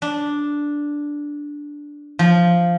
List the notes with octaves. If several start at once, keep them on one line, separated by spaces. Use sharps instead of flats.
D4
F3